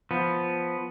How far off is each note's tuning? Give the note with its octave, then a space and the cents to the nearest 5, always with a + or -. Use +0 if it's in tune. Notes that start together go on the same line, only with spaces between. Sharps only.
F3 +0 B3 +0